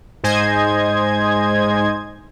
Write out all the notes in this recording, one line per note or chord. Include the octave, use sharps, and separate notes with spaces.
G#2 C5 D#5 G#5 G#6